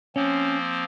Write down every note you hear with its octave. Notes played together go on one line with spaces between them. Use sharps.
F3 A#3 C4 C#4